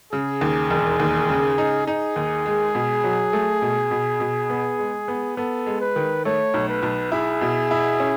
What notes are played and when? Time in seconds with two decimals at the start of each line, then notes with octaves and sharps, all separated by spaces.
0.12 C#3 G#4
0.41 D#2
0.70 E1
1.00 D#2
1.29 C#3
1.58 D#4
1.87 D#4 G#4
2.16 D#2
2.46 G#3
2.75 B2
3.04 F#3
3.33 A3
3.62 B2
3.91 B2
4.20 B2
4.50 B3
4.79 G#3
5.08 B3
5.37 B3 A4
5.66 G#3
5.81 B4
5.96 D#3
6.25 A3 C#5
6.54 B1
6.69 B4
6.83 B1
7.12 E4 G#4
7.41 B2
7.71 E4
8.00 C#4